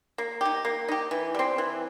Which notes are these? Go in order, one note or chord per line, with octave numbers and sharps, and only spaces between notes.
A#3
D#4 G4
A#3
D#4 G4
E3
G3 C4
E3